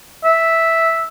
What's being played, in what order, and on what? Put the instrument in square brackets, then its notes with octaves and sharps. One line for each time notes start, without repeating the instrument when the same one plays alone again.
[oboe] E5